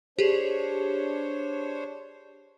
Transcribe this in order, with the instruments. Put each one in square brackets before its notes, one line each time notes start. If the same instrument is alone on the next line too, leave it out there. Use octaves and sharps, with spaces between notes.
[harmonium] D4 C5 C#5 [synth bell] G4 G#4